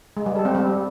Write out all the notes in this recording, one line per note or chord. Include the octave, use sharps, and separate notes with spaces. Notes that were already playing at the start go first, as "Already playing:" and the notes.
G#3
G3
A4
C4
G3